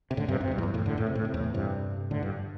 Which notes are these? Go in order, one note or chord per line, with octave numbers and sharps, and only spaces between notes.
C3
A2 D3
G2 C3
G2 C3
E2
G2
E2
G2
E2 A2
A2 D3
A2
C3
A2
C3
E2 A2
G2 C3
A2 D3
G2